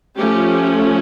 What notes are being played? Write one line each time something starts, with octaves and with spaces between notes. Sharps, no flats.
F3 A3 C#4 G4